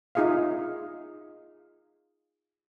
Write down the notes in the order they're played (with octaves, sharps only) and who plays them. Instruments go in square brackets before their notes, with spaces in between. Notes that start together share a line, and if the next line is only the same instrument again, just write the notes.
[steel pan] D#4 F4 G#4 E5 F5